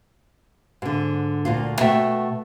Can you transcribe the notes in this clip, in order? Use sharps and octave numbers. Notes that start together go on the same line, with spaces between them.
G#2 D3
D2 A#2 F4
B2 A3 E5 G5